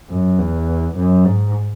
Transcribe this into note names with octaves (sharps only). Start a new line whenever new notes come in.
F#2
E2
F#2
G#2